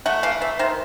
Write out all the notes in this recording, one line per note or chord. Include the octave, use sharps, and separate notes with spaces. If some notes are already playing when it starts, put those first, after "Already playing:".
A3 F#5
E3 F5
A3 E5
D#3 C5